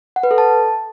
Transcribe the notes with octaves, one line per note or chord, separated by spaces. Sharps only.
F#5
B4
A4
A5